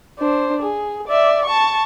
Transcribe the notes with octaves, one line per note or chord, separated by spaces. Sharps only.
D4 C5
G#4
D5 E5
A5 C#6